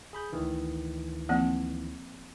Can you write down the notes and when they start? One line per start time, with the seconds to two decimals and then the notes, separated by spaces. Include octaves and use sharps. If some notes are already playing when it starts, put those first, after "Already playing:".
0.13 G#4 B5 G6
0.33 D2 D#3 E3
1.29 F3 A#3 C4